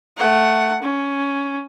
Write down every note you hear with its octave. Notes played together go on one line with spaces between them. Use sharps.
A3 F#5
C#4